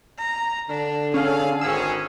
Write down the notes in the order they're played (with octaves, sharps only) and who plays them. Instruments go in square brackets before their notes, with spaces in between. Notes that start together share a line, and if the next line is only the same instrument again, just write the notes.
[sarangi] A#5
[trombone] D3 [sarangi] D4
[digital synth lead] C#4 [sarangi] G#4 [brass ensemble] A4 F5
[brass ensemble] G#1 C#4 [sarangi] G#4 [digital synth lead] E6